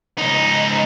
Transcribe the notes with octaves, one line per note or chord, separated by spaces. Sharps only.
C#2 D#4